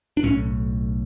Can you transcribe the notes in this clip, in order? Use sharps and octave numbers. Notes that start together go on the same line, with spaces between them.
D4
B1 A2 C#4